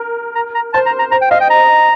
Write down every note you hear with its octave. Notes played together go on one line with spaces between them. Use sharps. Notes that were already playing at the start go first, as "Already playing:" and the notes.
Already playing: A#4
A#5
A#5
C5 A5
A#5
A#5
C5 A#5
G5
D#5 F5
G5
A#5